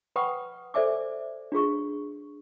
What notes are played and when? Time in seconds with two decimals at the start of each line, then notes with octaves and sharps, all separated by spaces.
0.16 B4 F#5 G5 B5 C#6 D#6
0.74 A4 C5 D5 E5 G#5 D6
1.52 D4 F4 G#4 C#6